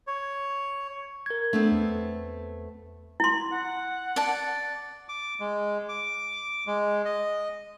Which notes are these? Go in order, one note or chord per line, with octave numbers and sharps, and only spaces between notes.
C#5
A#4 G#6
A3 B3 C4 D4
E2
E4 C6
F#5
D5 A5
D6
G#3
D6
G#3
D#5